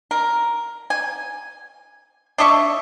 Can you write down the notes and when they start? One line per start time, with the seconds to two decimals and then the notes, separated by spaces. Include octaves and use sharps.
0.11 A#4
0.90 G#5
2.38 D4 D#5 E5 C#6